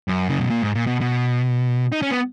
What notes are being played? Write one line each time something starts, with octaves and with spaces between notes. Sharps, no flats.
F#2
C#3
B2
A#2
G#2
A#2
B2
B2
D#4
C#4
B3